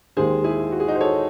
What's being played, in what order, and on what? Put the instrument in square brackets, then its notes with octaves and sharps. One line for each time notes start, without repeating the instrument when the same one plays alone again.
[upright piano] D#2 D#3 G#3 G#4 C5
E4 G#4
F#4
G#4
D#4 F#4
C5
A4 C#5